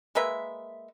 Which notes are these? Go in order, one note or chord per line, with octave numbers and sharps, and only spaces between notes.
G#3 A#3 B4 E5